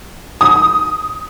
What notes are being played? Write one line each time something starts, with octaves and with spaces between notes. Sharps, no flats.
D#6